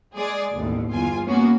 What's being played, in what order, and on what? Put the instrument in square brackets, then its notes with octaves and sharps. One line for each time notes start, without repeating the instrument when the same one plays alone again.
[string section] G#3 G#4 D5
A1 D#2 B2
G1 E2 F4 G#5
A#3 B3 C#4 F#4